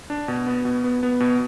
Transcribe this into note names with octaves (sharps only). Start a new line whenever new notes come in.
D4
B2
B3
B2
B3
B3
B2